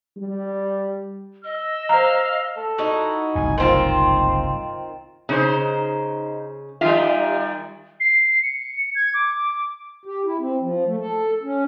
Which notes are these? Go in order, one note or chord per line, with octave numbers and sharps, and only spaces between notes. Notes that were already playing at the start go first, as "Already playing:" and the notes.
G3
D#5 E6
C5 F5 A#5
A4
D#4 E4 F#4
F#1 C2 G2 G#5
D#3 C4 F4 C5
C#3 D#4 C5
D#3 G3 F4 E5 F5
C7
C#7
G#6
D6
G4
E4
C4
F3
A3
A4
C#4